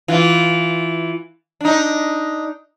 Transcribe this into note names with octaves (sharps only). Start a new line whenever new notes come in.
E3 F4
D4 D#4